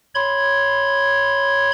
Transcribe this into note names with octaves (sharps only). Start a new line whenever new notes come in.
C#5 B5 C6 G#6